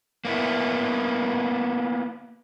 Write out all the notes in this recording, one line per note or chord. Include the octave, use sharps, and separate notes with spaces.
A#3 B3 E4